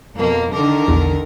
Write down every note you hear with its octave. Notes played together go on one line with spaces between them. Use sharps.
F2 B2 A#3
D3 D#3 D4 A#4 D6
A#1 E2